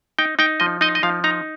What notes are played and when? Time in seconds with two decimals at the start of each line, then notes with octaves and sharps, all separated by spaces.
0.19 D#4 G5
0.39 D#4 G5
0.60 F3 D#5
0.81 D#4 D#5
0.95 D#5
1.03 F3 F5
1.24 D#4 A#5